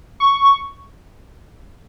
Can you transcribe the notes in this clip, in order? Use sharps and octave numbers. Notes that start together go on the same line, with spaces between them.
C#6